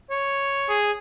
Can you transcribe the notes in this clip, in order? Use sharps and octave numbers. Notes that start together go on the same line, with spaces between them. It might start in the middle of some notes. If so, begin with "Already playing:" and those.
C#5
G#4